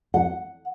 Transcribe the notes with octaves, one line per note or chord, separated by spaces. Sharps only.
F#5